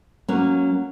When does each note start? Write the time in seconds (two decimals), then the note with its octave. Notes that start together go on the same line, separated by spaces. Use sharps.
0.28 F#3 A#3 C#4